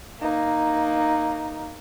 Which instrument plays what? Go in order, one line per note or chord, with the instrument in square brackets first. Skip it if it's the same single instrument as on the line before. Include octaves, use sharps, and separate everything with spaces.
[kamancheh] A#3 D#4